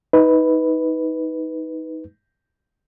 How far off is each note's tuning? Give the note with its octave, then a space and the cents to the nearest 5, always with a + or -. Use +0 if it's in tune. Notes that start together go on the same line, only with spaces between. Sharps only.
D#4 +25 B4 +0